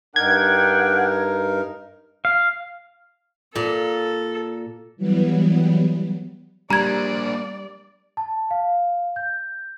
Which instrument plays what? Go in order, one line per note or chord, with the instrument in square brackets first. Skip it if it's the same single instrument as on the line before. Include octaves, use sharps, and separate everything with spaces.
[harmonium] G2 D#4 A#4 [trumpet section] D4 F#5 G5 [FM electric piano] G#6
[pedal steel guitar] F5
[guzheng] A#2 [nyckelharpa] A4
[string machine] E3 F#3 G3 B3
[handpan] G3 [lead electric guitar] A#3 D4 [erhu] D5 [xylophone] A#5 G#6
[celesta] A5
F5
G6